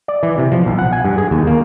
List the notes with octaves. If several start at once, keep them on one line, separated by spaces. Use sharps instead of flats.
D5
E3
C3
F3
B1
F#5
G#5
G2
G#4
D#2
A#3